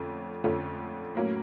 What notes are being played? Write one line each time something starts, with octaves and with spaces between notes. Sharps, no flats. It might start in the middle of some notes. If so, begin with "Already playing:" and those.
Already playing: F2 D3 A3 C#4
F2 D3 F3 A3 C#4
A2 F#3 A#3 C#4